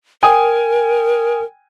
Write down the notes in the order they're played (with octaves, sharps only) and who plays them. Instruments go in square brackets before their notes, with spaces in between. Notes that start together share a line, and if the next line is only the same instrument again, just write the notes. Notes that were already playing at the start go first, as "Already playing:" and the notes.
[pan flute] A#4 [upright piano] G5 G#5 D#6